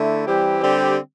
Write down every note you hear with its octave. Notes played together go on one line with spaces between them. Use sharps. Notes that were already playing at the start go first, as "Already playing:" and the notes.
Already playing: D3 A3 E4
E3 G3 C4 G4
D3 G3 C4 G4